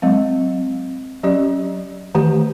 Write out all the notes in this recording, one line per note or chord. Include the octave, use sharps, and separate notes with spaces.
F#3 G#3 C4
F#3 C#4 G4 D5
D#3 E3 A3 G4